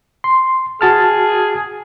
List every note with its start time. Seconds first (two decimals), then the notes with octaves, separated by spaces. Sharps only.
0.24 C6
0.81 F#4 G#4 A5 F6